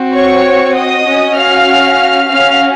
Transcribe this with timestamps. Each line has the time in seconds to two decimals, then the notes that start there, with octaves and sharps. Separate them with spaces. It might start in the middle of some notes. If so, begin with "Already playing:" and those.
Already playing: C4 F#4
0.14 C#5 C#6
0.75 D#5 D#6
1.06 C#4 F#4
1.37 F5 F6
2.29 C#4 F#4 F5 F6